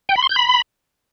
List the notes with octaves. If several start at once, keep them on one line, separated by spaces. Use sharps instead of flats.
G5
B5
C6
G6
B5